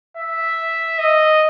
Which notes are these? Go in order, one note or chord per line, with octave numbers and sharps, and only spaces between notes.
E5
D#5